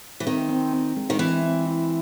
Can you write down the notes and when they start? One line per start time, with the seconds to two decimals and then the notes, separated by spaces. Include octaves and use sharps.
0.20 E3
0.26 D#3 C4
0.49 C4
0.73 C4
0.97 G#3
1.10 D#3
1.19 E3 C4
1.43 C4
1.66 E4